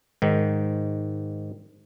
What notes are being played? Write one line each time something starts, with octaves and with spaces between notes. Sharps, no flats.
G#2 D#3